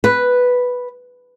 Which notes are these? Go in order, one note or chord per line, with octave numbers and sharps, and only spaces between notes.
B4